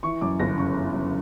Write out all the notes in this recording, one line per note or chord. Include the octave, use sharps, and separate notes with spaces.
E3 C#6
F#2 D6
G1 A#6
C#3 C#6
E3
F#2